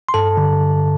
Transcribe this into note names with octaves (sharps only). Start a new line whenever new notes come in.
C6
G2 A4 A5
D3